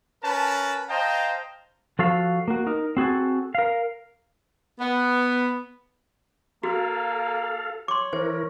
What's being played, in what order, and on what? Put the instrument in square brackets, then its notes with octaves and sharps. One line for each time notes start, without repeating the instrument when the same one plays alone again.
[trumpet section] C#4 A#4 B4 A5
C5 D#5 F5 G5 A5 A#5
[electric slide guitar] F3 F#4 A4 F5
A#3 F#4
D#4 A#4
C4 F#4 G#4 A4
A#4 F5
[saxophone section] B3
[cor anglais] A#3 [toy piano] F#4 [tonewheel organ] A4 F5
[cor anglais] C#5 [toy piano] C6 D6
[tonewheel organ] E3 A#4 [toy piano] C5